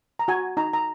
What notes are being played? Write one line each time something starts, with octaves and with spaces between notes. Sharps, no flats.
A#5
F#4 G#5
D#4 A#5
A#5